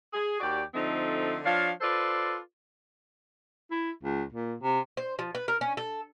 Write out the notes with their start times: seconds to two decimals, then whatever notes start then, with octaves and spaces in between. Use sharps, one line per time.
0.14 G#4
0.40 D#2 F#4 G4 D5
0.74 D3 F3 A3 C4 D#4
1.45 F3 D4 C#5 F5
1.81 F4 A4 B4 C5 D5
3.71 E4
4.03 C#2
4.32 A#2
4.62 C3
4.97 C5
5.19 F3
5.35 B4
5.48 A#4
5.61 C#4
5.77 A4